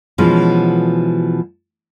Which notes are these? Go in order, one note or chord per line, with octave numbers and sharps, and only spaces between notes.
B2 E3 F3 G#3 C#4